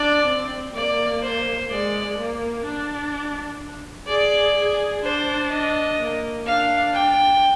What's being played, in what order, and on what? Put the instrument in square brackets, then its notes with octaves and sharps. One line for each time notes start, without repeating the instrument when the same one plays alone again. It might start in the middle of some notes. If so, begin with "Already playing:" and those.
Already playing: [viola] D4 [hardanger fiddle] D5
[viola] C4
[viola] A#3 [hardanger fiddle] D5
[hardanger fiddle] C5
[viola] G#3 [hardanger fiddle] D5
[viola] A#3
D4
[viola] G#4 [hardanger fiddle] D5
[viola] G#4
[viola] D4 [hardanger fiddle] C5
[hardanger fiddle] D#5
[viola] A#3
[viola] D4 [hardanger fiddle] F5
[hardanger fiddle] G5